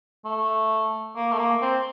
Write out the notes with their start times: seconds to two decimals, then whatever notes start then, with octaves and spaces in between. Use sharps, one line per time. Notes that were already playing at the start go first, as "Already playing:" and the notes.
0.25 A3
1.16 A#3
1.32 A3
1.39 A#3
1.62 C4